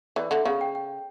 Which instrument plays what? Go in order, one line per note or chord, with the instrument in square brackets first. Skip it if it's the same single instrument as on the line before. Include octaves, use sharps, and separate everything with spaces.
[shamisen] E3 [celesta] D5
[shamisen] D3 [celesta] E5
[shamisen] C#3 [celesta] F5
[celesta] G5
G5